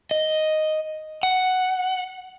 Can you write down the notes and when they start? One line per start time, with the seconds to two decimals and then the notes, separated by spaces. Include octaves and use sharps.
0.11 D#5
1.23 F#5